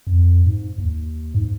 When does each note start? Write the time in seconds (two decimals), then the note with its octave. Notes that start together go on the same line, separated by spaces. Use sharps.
0.07 F2
0.46 G#2
0.78 D#2
1.34 G#2